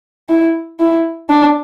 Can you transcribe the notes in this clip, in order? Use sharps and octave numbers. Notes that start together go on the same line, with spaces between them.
E4
E4
D4